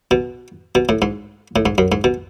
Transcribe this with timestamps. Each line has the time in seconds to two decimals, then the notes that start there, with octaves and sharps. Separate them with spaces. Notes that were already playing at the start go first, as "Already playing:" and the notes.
0.11 B2
0.75 B2
0.89 A2
1.02 G#2
1.56 A2
1.66 G#2
1.78 F#2
1.92 G#2
2.04 B2